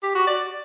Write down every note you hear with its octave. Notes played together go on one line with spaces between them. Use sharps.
G4
F#4
D5